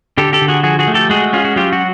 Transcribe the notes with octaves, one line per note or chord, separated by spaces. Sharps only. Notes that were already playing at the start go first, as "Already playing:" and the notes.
D3 G4 A4
G4 A4
D3
F#4 G#4
F3 F#4 G#4
F#4 G#4
A3
G4 A4
G#3 F#4 G#4
C#4 F4
F#4
F#3 F4 G4
F#4